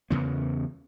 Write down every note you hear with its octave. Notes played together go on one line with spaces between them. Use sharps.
E2 C#3 B3